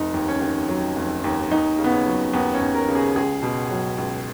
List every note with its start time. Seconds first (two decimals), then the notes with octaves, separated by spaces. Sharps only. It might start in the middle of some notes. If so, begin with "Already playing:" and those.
Already playing: F1 D#4
0.14 D#2
0.28 C#4
0.41 D#3
0.69 F#3
0.96 F1
1.24 D#2
1.51 D#2 D#4
1.78 C#3
1.84 B3
1.92 C#4
2.06 F#3
2.33 D#2 B3
2.54 C#4
2.60 D#2
2.74 A#4
2.88 C#3
2.95 G#4
3.16 C#2 G#4
3.43 B2
3.70 F#3
3.98 C#2